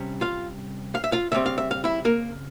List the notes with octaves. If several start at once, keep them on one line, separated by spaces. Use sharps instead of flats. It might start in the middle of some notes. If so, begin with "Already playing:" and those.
Already playing: C3 G3 C#4
F4 F5
F5
E5
F4 F5
C#3 G3 C4 E5
F5
E5
F5
E4 E5
A#3 A#4